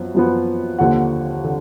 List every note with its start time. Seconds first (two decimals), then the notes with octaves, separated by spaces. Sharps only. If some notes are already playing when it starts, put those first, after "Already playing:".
Already playing: F#2 F3 B3
0.15 F#2 F3 B3
0.79 D#2 D3 F3 F#5
1.44 D3